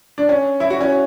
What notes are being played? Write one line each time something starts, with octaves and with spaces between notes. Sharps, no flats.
D4
C#4
E4
F#4
C#4